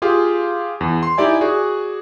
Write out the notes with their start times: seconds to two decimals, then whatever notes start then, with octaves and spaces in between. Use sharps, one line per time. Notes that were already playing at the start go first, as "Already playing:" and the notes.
0.02 F4 G4 G#4 F5
0.81 E2
1.03 C6
1.17 D#4 E4 G4 D5 E5 G#5
1.41 F#4 G#4 D5